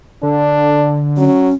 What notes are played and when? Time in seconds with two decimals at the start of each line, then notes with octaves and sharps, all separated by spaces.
0.23 D3 D4
1.17 F#3 C#4